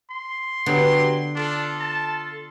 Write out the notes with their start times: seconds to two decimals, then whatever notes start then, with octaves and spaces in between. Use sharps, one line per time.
0.10 C6
0.66 D3 F#3 B3 G4
1.35 D4 F4 A4
1.80 A5